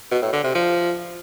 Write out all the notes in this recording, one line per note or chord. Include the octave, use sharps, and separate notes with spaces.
B2
A2
D3
C3
F3